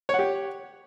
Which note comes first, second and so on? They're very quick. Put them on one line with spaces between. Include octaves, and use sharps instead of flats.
C#5 F#5 G4